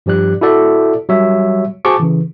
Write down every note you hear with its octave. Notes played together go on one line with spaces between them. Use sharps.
G2 F3 G4 D5 F#6
E4 F#4 A4 D5 E5
F#3 G3 C#5 E5
F#4 G#4 C5 A5 C#6 D6
C#3 E3